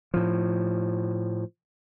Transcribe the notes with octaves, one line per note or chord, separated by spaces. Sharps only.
A2 F3